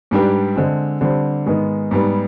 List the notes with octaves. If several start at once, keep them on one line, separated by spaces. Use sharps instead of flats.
G#2 G3 D4 G4 B4
D3 G#3 C4
D3 G3 C4
G#2 D#3 G#3 B3
G#2 G3 B3